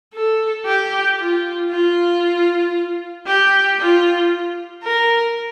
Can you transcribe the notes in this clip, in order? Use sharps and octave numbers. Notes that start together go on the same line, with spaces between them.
A4
G4
F4
F4
G4
F4
A#4